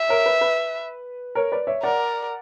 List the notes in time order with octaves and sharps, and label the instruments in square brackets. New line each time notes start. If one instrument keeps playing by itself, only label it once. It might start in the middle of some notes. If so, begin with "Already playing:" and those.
Already playing: [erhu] E5
[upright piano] A#4 C#5
B4
B4
A#4 C#5
B4 D5
C#5 E5
[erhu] A#4 [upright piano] D5 F#5